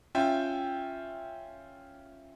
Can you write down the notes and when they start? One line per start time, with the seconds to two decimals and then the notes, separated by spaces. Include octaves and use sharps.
0.15 C#4 F4 E5 G5